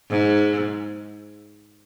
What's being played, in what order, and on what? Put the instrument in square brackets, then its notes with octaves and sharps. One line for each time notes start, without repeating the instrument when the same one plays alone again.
[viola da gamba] G#2